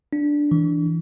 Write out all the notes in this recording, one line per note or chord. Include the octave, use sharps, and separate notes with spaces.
D4
E3